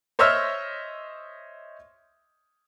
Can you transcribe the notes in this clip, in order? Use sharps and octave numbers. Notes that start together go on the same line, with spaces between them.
C5 C#5 D#5 E5 E6 F6